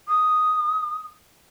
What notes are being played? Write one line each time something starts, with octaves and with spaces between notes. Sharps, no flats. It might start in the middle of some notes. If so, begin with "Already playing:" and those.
D#6